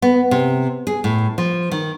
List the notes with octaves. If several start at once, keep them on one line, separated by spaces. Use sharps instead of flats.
B3
C3
G#4
A2
F3
D#3